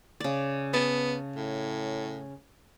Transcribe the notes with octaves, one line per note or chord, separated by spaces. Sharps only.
C#3 D5
B3 A5
A2